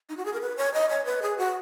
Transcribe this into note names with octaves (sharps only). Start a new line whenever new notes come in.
D#4
F#4
G#4
A#4
B4
C#5
D#5
C#5
B4
G#4
F#4